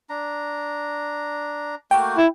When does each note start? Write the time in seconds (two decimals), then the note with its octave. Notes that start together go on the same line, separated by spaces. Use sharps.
0.10 D4 A#5
1.91 A3 A#3 F#4 G5
2.18 E4